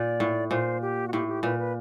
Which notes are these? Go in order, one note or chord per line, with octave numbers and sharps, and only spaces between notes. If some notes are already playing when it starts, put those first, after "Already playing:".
Already playing: A#2 D5
A2
A#2 C5
G4
F#4
A2 G4
G4
A#2 B4
B4